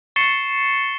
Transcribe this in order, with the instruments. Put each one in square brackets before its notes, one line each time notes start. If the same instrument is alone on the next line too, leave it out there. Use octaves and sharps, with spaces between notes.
[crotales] C#6 A6 C7 C#7 E7 G7